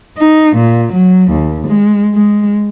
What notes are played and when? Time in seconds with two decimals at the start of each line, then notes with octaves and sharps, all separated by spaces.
0.17 D#4
0.56 A#2
0.93 F#3
1.31 D#2
1.67 G#3
2.14 G#3